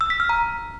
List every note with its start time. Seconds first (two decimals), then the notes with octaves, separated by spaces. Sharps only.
0.01 E6
0.10 B6
0.20 F6
0.29 A#5